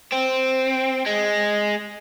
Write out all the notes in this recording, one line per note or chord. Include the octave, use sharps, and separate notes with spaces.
C4
G#3